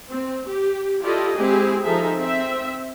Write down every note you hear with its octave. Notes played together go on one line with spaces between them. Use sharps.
C4
G4
E4 F4 G4 A4 D5 D#5
G#3 C4 E4 G4 G#4
F3 D#4 G#4 A4 E5
C4 E5